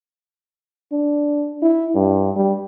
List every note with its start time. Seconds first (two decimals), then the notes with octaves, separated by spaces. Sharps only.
0.92 D4
1.62 E4
1.95 G2
2.36 G3